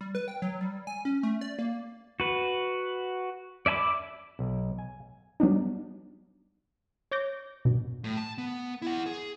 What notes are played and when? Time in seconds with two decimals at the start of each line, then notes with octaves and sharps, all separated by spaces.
0.01 G3
0.15 B4
0.28 G5
0.42 F#3
0.61 G3
0.87 G#5
1.05 C#4
1.23 A3
1.41 D5
1.59 A#3
2.20 F#4 B4
3.66 D5 E5 G#5 B5 D6
4.39 B1
4.79 G#5
5.40 F#3 G3 B3 D4 D#4
7.11 C#5 D6 G6 A#6
7.65 G2 B2
8.04 A2
8.17 A5
8.38 B3
8.82 E4 F#5
9.06 G#4